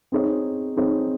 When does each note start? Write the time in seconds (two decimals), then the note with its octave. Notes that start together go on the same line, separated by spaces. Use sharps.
0.12 C4 D#4 G#4 C#5
0.77 C4 D#4 G#4 C#5